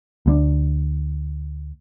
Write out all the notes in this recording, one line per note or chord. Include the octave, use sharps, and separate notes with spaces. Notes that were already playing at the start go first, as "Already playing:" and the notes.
D2 G3 D4